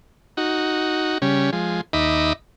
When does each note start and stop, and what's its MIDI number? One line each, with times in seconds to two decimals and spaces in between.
0.37 1.18 63
0.37 1.18 66
1.22 1.51 49
1.22 1.51 55
1.22 1.51 61
1.53 1.81 53
1.53 1.81 56
1.93 2.33 39
1.93 2.33 63
1.93 2.33 75
1.93 2.33 76
1.93 2.33 83
1.93 2.33 86